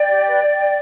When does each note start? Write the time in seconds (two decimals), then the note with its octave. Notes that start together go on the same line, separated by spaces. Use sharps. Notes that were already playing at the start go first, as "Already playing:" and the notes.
Already playing: D5 G5
0.08 G4
0.26 B4